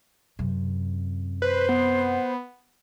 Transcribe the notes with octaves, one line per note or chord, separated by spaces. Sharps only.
F#2 C3
B4 C5
B3